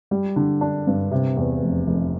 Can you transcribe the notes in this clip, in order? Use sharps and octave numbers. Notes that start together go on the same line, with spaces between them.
G3
D3
D4
G2
C3
E2
F1
F1